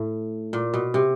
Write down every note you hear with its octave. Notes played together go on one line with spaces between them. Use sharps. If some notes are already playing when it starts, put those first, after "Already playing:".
Already playing: A2
A#2
B2
C3